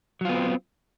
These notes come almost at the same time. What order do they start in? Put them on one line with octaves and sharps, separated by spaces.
F#3 F4 B3 C4